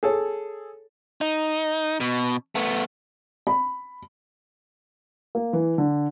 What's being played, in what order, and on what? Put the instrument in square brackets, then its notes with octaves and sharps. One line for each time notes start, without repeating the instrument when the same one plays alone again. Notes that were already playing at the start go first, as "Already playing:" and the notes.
[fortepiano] G#4 A4 C#5
[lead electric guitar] D#4
B2
A3 B3
[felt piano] B5
[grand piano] A#3
E3
D3